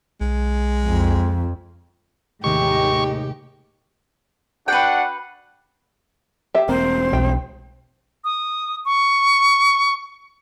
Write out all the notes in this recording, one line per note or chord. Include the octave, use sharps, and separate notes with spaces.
B1 G#3
F2
D#2 A2 C3 D#3 G#3 D#4 G4 C#6
D4 F#4 B4 F#5 G5
G4 E5
E1 A#3 C4 C5
B1 G5
D#6
C#6